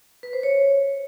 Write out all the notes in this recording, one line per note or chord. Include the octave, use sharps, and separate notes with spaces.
B4
C5
C#5